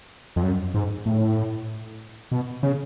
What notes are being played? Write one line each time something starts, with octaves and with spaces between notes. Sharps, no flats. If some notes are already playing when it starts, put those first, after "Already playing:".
F2
F#2
G#2
A2
B2
C#3